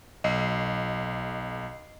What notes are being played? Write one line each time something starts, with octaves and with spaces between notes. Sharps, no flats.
B1 D#5 C7